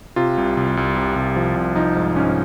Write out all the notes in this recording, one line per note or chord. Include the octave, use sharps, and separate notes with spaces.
C3 F4
C2
C2
C2
C3
C2
F3
C2
F3 D#4
G#2
G#2 C#4